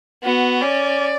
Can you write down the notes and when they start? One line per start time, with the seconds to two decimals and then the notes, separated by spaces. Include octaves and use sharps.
0.23 B3 F#4
0.62 C#4 D5